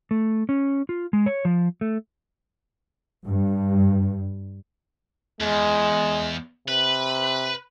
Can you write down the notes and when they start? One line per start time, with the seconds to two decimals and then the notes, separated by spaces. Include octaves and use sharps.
0.11 A3
0.49 C#4
0.89 F4
1.13 G#3
1.26 C#5
1.45 F3
1.81 A3
3.25 G2
5.41 E2 G#3
6.68 C3 B4